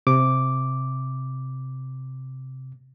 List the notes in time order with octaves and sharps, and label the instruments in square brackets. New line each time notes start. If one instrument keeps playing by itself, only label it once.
[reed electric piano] C3 D6